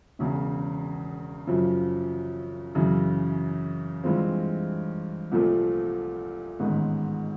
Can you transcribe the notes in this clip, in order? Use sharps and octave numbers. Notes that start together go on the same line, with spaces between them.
E1 E2 C#3
F#2 C#3 F3
F#2 C#3 E3
G2 E3 G#3 C4 F4
C2 A#2 F3 A3
A1 G#2 D#3 G#3 B3